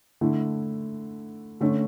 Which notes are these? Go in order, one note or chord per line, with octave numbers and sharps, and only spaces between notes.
D3 A3 E4
D3 A3 C#4